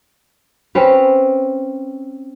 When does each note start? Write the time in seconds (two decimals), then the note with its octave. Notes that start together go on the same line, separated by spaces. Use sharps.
0.75 C4 C#4 B4